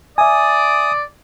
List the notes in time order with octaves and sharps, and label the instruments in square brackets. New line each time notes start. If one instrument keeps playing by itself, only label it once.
[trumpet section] D5 [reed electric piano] E5 G#5 [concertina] D#6